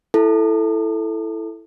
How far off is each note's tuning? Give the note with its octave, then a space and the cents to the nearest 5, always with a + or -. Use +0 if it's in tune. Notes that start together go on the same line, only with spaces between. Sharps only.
E4 +0 A4 +0